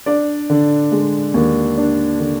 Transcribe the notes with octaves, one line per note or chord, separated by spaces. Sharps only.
D4 D5
D3
G#3
D#2
D4
D3